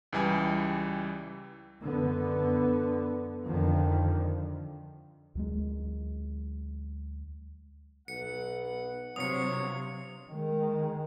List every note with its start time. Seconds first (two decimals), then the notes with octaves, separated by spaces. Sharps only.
0.13 C#2 E3 G3 G#5
1.83 F#2 D3 B3
3.46 F2 D3 D#3 F3
5.35 D2 F#3 G#3
8.08 B1 B3 F#5 C#7
9.16 G2 C3 F#3 F4 C#5 D#6 C#7
10.30 D#3 G#3